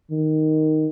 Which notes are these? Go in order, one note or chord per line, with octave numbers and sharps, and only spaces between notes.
D#3